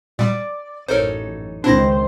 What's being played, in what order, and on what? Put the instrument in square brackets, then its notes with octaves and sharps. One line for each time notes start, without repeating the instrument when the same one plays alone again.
[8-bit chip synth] A#2 G3 [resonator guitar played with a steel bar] D5
[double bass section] A1 F#2 E3 [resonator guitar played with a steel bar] D#4 A4 C#5 [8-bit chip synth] A#4 C5
[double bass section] C#2 D#3 [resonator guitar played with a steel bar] C4 [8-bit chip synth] D4 E4 A#6 [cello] C5